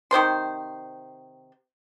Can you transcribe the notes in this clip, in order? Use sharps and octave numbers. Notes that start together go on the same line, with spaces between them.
C3 D#3 C5 C6